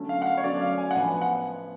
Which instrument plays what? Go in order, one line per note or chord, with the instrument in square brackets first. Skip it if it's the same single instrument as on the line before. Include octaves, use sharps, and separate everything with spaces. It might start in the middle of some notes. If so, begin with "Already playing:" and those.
Already playing: [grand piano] D3 F#3 A3 C#4
F5
F#5
F5
C#5
D3 F#3 A3 C#4 D5
F5
G#5
F#5
A2 F3 B3 D4 G#5
F#5